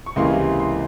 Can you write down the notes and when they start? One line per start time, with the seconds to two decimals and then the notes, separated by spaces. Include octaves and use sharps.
0.06 C#6
0.16 C#2 C3 E3 A#3 C6
0.60 C6